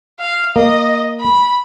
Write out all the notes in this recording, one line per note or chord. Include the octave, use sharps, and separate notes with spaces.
F5
A#3 D#5
B5